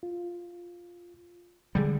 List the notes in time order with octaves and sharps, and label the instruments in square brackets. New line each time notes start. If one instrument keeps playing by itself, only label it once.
[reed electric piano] F4
[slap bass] D3 G3 [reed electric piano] G#3 G#4